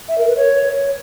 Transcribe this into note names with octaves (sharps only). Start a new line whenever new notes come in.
E5
A#4
B4
C#5